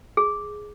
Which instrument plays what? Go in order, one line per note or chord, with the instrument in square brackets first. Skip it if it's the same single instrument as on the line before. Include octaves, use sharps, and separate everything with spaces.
[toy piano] G#4